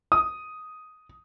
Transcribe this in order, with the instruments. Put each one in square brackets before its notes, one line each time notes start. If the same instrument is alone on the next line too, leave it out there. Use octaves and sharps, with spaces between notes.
[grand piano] D#6